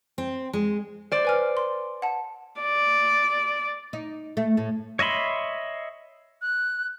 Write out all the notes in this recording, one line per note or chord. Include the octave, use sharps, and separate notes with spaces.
C4
G#3
C5 D5
B4 G#5 F6
C6
F#5 A5
D5
D#4
A3
A2
C#5 D#5 E5 B5 C6
F#6